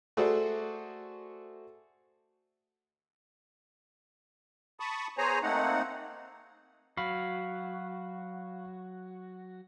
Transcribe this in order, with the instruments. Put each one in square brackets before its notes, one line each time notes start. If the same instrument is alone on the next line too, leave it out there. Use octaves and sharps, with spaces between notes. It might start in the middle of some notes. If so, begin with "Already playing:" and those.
[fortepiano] A3 F#4 G#4 A4 C5 D5
[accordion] A5 B5 C#6 D#6
B3 G#4 C5 C#5 G#5 A#5
A3 A#3 C4 D#4 F#5
[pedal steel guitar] F#3 F#4 [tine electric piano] F5 B5